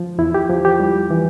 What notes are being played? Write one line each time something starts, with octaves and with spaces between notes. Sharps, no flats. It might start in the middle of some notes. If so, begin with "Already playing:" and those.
Already playing: F3
E2 E4
G4
F3
G4
G3
E3